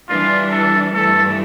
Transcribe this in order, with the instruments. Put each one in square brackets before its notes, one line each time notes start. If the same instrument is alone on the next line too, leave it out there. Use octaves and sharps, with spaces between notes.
[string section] E3 G3 D4 [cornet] F4
[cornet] A4
[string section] G2 E3 A3 [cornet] A4